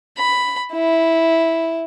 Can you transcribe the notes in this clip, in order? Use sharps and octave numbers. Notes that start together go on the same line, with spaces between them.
B5
E4